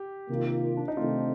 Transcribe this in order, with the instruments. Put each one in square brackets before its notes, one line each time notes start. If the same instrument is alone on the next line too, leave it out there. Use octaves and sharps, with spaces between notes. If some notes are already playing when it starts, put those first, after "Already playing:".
Already playing: [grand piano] G4
[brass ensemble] C3 D#3 A#3 F4
[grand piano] D4
D#4
[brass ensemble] C3 D#3 A3 C4 [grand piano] F4